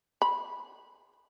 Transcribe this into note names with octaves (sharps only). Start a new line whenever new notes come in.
B5